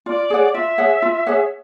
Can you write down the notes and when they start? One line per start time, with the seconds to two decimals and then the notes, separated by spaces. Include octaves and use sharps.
0.06 F4 D5
0.30 G#4 C#5 F#5
0.54 F4 E5
0.78 G#4 C#5 F#5
1.02 F4
1.26 G#4 C#5 F#5